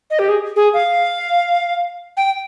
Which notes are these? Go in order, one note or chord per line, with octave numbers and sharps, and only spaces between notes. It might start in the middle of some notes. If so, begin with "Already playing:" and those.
D#5
G4
G#4
G#4
F5
G5